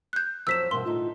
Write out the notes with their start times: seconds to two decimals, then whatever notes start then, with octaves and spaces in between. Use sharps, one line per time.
0.13 F#6 G6
0.47 F2 F#3 C5 E6 B6 E7
0.71 G2 B2 E3 A#4 C6
0.86 A2 D3 D#4 F4